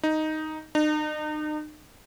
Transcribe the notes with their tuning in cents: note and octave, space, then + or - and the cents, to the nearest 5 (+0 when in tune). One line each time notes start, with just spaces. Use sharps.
D#4 +0
D#4 -40